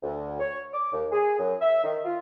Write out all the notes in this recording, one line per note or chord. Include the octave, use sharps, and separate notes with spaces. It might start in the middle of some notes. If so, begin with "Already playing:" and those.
D2
C#5
D6
D#2
G#4
F#2
E5
D#3
F4